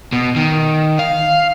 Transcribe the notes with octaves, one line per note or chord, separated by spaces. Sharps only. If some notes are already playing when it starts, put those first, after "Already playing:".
B2
D#3
F5